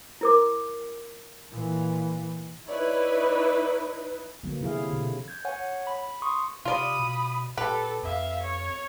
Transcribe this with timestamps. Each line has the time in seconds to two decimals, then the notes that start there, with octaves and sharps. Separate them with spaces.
0.21 E4 A#4 D6
1.51 A#2 E3
2.67 D#4 E4 B4 C#5 D5
4.43 D3 F#3 A#3 B3
4.61 C3 F3 E4 G#4 F5
4.90 B2 D3
5.28 G6 G#6
5.45 C#5 F#5 G#5
5.87 B5
6.22 C6 C#6 D#6
6.65 C3 F4 D5 B5 D#6
7.00 B2
7.57 A#2 G4 A4 B4
8.03 F2 E5 F5
8.42 C#5